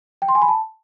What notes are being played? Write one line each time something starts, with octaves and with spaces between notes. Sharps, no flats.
G5
C6
G#5
B5
A5